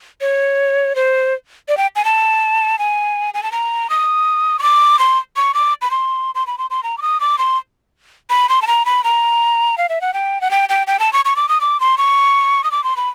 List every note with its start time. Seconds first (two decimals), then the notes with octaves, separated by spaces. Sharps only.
0.21 C#5
0.95 C5
1.69 D5
1.77 G5
1.96 G#5
2.05 A5
2.79 G#5
3.34 G#5
3.43 A5
3.52 A#5
3.90 D#6
4.59 C#6
4.63 D6
4.99 C6
5.36 C#6
5.54 D6
5.82 B5
5.91 C6
6.35 C6
6.47 B5
6.58 C6
6.70 C6
6.83 A#5
6.98 D6
7.02 D#6
7.20 D6
7.38 C6
8.30 B5
8.49 C6
8.62 A5
8.67 A#5
8.86 B5
9.04 A#5
9.78 F5
9.89 E5
10.01 F#5
10.14 G5
10.41 F#5
10.51 G5
10.69 G5
10.87 G5
10.99 A5
11.13 C#6
11.25 C#6
11.36 D6
11.49 D#6
11.61 D6
11.80 C6
11.98 C#6
12.64 D#6
12.71 D6
12.84 C6
12.97 B5